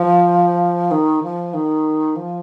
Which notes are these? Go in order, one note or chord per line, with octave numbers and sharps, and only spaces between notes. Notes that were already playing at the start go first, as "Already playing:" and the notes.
Already playing: F3
D#3
F3
D#3
F3